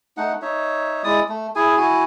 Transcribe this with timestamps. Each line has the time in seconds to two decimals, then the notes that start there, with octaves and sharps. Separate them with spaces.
0.17 A3 D#4 F#5
0.42 D#4 C#5 E5
1.04 G#3 E4 D5 D#6
1.29 A3
1.56 E4 G#4 G#5
1.77 E4 F#4 G#5